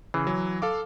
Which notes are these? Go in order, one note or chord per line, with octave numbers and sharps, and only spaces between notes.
C#3 E3
F#3
A4 F5 D6